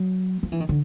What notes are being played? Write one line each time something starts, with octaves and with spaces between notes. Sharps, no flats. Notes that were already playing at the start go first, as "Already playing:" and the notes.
Already playing: F#3
F3
E3
D#3
D3